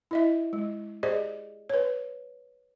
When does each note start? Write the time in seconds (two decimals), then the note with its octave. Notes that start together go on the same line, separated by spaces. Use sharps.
0.11 E4 D#5 E5
0.53 G#3
1.03 G4 G#4 C5 D5 D#5
1.70 B4 C#5